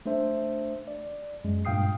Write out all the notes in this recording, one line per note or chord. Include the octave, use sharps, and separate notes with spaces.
A3 D4 C5 E5
D5
F#2 G#3
G2 A#2 F5 G5 D#6 C7